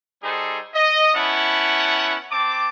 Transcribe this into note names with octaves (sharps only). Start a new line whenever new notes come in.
G3 D#4 G#4 A4 C5
D#5
B3 C#4 E4 F#5 A5
C4 A5 D6